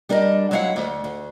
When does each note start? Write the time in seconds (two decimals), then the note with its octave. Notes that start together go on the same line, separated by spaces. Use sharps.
0.09 G3 D4 A#4 D5 D#5
0.51 F#3 G#3 B3 E4 F5 F#5
0.76 D2
1.04 D2